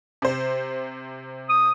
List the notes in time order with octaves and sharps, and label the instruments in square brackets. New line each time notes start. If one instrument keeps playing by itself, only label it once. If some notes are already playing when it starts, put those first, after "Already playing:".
[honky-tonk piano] C3 C5
[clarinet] D#6